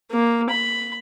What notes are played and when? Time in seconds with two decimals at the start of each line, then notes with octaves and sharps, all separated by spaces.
0.11 A#3
0.50 B5